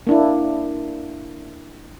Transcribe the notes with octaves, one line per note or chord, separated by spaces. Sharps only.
A#3 D4 E4